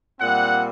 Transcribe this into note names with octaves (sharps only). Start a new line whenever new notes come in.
A#2 G3 C4 F#5